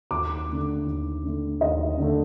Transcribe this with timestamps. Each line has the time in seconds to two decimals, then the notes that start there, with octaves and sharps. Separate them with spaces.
0.11 D#2 D6
0.48 D3 A3
0.86 D#2
1.23 D3 A3
1.61 D#2 D#5
1.98 D3 A3